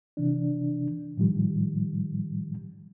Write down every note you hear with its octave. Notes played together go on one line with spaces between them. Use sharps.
C3 E3 D4
A2 D#3 F3 G3